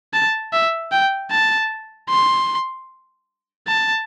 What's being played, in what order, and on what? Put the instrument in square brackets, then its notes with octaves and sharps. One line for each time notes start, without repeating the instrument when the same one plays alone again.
[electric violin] A5
E5
G5
A5
C6
A5